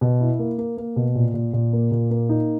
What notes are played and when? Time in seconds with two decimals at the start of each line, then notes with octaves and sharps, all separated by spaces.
0.01 B2
0.21 E4
0.39 A#3
0.58 A#3
0.77 A#3
0.96 B2
1.15 A#2
1.34 A#2
1.53 A#2
1.73 A#3
1.91 A#2
2.11 A#3
2.29 D#4